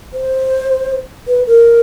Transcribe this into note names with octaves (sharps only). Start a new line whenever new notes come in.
C5
B4
A#4